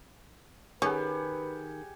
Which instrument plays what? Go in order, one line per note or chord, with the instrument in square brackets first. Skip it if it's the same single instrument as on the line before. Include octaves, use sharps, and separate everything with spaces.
[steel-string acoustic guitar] D#3 [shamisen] C#4 [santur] G4 G#4 F#5 [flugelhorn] B4